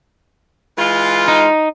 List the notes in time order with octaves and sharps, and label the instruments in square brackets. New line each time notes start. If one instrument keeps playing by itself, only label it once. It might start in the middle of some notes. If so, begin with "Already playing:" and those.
[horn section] E3 G#3 F4
[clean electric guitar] D#4